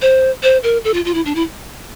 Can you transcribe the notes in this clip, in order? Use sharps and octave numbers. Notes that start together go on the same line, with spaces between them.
C5
C5
A#4
A4
F4
F4
E4
D4
E4